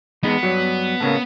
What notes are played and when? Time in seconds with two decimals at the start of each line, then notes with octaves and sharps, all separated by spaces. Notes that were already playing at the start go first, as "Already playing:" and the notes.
0.23 E2 G#3 B3 D#4
0.43 G2 F#3
1.00 A2 C#3 A#3